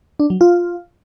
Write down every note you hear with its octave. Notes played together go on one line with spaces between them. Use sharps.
D4
F#3
F4